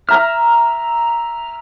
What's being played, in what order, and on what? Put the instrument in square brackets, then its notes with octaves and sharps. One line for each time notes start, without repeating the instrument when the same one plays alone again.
[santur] E5 A#5 [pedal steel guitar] F6